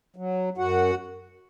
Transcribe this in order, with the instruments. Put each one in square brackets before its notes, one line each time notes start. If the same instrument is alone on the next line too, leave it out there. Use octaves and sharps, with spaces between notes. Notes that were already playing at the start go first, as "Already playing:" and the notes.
[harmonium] F#3
F#2 F#4 F#5